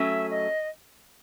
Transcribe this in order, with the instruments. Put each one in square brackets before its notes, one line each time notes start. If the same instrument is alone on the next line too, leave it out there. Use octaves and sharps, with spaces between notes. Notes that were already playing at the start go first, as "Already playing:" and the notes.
Already playing: [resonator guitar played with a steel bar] F#3 A3 C#4 [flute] E5
[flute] D#5